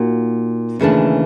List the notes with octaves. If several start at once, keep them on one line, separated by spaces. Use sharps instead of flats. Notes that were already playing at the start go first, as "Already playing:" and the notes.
Already playing: A#2 A#3 D#4 F#4
D#2 C#3 E3 A3 D4